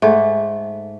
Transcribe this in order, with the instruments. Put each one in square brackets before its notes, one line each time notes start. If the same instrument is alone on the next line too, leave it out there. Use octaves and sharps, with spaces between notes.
[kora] G#2 A3